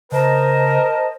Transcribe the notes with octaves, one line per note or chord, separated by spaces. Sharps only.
C#3 A#4 C5 D#5 A5